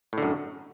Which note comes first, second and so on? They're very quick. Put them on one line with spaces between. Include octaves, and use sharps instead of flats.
A2 D3 F#2